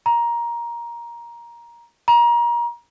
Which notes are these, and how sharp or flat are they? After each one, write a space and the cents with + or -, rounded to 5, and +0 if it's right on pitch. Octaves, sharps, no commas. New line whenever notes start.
A#5 +15
A#5 +30